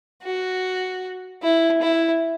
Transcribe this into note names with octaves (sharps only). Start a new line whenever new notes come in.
F#4
E4
E4